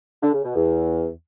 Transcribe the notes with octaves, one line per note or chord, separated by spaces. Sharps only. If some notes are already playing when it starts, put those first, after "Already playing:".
D3
C#3
B2
E2